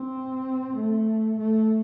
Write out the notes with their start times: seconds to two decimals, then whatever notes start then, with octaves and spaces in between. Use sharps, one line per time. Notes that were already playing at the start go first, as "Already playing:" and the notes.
Already playing: C4
0.77 A3
1.37 A3